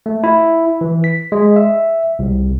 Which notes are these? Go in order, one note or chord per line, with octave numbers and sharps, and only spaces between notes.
A3
E4
E3
B6
G#3
E5
C2